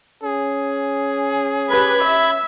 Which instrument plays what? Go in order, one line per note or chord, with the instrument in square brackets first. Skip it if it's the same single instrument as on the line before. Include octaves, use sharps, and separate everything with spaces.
[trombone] C#4 [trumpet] G#4
[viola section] G4 B4 [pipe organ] B5 G#6
[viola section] E5